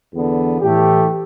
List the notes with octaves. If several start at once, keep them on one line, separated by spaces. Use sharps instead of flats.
E2 D3 B3
A2 E3 A3 G4